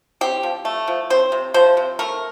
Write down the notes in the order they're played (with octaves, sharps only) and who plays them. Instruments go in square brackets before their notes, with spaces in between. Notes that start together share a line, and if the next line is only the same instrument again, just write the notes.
[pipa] C4 G4
F3
A3
F3
C4 C5
C3
F3 C5
C3
A3 A#4